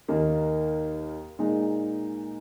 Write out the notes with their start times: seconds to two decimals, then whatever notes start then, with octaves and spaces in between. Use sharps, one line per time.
0.08 D#2 D#3 A#3
1.39 A#2 G#3 D#4